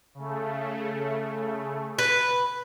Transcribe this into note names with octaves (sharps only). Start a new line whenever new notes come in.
C#3 A3
B4